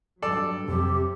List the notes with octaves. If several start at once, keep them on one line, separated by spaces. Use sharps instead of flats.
G2 F#3 A4 D5
F2 C3 G4